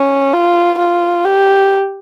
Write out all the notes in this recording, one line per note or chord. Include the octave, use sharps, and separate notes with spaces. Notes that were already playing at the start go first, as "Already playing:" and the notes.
Already playing: C#4
F4
F4
G4